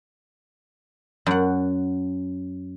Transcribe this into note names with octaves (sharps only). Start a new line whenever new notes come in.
F#2 F#5